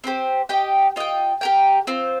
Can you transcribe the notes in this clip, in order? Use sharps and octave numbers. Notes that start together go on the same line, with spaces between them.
C4 D#4 G4 C5
G4 D#5 G5
F4 D#5 G5
G4 A#4 G5
C4 F4 C5